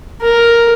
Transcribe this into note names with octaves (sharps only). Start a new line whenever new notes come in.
A#4